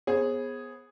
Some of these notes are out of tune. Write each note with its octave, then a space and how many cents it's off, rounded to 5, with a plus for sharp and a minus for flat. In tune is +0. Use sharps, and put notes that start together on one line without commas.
B3 +0 G#4 +0 C5 +40